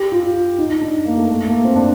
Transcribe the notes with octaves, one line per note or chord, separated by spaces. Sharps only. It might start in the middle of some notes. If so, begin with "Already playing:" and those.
Already playing: G4
F4
F4
D#4
D#4
D4
A#3
A3
A3
A#3
C4
D4